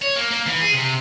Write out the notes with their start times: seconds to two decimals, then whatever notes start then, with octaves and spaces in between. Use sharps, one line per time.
0.02 C#5
0.16 A#3
0.31 A#3
0.47 E3
0.60 G#4
0.73 C3